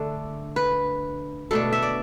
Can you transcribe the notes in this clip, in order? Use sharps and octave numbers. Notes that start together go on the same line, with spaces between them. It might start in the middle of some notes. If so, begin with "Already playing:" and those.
Already playing: D3 A3 D4
B4
B2 A3 D4 A4
E5
D5